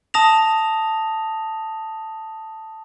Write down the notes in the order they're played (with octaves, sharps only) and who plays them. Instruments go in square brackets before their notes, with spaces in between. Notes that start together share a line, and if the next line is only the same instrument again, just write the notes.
[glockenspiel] A5 D#6 A#6 F7